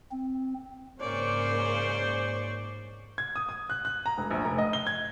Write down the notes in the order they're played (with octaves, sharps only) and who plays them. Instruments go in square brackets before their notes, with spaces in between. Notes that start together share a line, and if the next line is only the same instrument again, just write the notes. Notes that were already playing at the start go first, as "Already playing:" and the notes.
[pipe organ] C4
[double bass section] G#2 [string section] C#3 A#3 C#4 [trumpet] C5 [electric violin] D5 C#6
[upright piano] G#6
D#6
D#6
F#6
F#6
A#5
E1
A#1
F1
D#5
G7
G#6